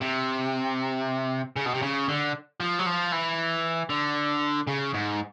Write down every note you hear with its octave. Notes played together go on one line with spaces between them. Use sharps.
C3
C#3
B2
C3
C#3
D3
F3
F#3
F3
E3
D3
C#3
G#2